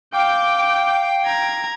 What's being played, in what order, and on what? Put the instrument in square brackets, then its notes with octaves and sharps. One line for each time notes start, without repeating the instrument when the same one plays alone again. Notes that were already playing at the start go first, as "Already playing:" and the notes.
[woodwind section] F5 G5 [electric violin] D6 G6
[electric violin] A#5 G#6